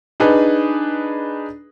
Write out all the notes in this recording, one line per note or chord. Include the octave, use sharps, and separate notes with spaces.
D4 D#4 G#4 B4